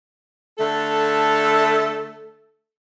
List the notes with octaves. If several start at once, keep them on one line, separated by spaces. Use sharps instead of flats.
D3 A3 A4